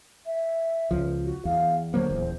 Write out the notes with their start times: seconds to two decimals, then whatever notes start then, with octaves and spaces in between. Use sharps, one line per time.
0.26 E5
0.91 C#2 F3
1.25 F#4
1.45 E2 F5
1.94 D3 F#3 A#3 C5
2.09 D#1 E2